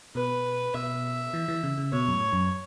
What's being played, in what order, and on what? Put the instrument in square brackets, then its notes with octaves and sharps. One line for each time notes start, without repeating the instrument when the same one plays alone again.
[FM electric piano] B2 [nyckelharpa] B4
[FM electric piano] B2 [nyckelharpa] E5
[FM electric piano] E3
E3
C#3
C#3
[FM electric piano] B2 [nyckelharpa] C#5
[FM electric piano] F#2
A2
F#2